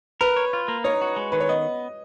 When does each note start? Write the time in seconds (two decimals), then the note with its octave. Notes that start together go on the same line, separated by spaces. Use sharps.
0.21 A#4 B4
0.36 C#5
0.53 F4
0.68 A#3
0.84 D#4 C#5
1.01 F#4
1.16 G#3
1.32 D#3 B4
1.40 C#5
1.49 B3 D#5